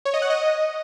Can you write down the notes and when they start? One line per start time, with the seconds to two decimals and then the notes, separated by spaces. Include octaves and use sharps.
0.05 C#5
0.14 D#5
0.22 F#5
0.30 D#5